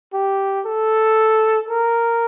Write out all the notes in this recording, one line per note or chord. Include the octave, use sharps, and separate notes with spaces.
G4
A4
A#4